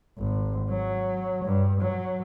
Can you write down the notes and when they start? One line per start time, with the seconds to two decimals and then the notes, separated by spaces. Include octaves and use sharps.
0.18 G#1
0.69 F#3
1.45 G2
1.80 F#3